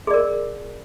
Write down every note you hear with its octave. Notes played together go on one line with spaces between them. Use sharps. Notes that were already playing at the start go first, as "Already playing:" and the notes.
G#4 A#4 D5